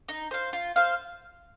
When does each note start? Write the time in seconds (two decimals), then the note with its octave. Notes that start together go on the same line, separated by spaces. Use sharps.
0.08 D#4
0.31 C5 F5
0.53 F4
0.76 C5 F5